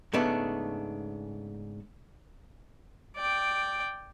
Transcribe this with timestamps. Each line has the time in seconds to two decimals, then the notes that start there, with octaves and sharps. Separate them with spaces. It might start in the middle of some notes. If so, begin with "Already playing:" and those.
0.13 G#2 C#3 A3 B3 D4
3.16 D5 G5